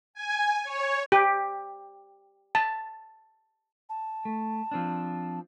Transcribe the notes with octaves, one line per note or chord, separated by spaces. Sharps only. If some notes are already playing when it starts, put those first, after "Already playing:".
G#5
C#5
G4
A5
A5
A3
F3 C4 D4